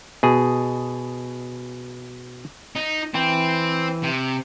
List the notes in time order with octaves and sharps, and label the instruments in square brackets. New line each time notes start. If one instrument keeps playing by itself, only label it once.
[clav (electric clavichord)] B2 G#4
[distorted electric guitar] D#4
[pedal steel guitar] E3 G5 [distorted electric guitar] C4
[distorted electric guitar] C3